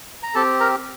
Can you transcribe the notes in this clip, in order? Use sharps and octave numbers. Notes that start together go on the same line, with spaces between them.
A#5
C4 G4 A4 A5
A#4 A#5